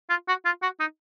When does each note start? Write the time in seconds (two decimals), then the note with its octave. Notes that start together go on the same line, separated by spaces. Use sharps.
0.10 F4
0.28 F#4
0.45 F4
0.62 F#4
0.80 D#4